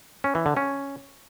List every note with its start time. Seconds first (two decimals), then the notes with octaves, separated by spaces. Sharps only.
0.24 C#4
0.35 E3
0.46 D3
0.57 C#4